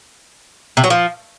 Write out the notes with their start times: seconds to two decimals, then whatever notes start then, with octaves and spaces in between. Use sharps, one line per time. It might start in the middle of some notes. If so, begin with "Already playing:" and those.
0.77 C3
0.84 F#3
0.90 F3